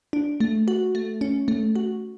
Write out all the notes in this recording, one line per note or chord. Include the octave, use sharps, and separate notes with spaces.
D4
A3
F#4
A3
C#4
A3
F#4